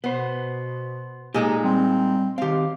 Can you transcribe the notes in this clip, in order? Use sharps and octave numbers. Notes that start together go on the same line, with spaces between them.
B2 B3 B4 C5
A#2 G#3 D#4 G4 A4
G3 C4
D#3 C4 G4 F5